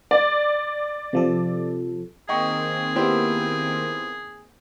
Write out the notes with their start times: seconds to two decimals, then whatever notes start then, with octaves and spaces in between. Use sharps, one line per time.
0.11 D5
1.13 C3 F3 A4
2.29 D#3 A#3 C4 G#4 D#5 G5 C#6
2.96 B3 E4 G4 C5